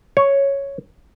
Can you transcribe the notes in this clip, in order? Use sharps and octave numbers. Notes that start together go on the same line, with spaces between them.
C#5